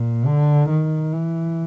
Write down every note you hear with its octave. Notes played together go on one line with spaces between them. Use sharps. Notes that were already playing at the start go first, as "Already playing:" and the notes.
Already playing: A#2
D3
D#3
E3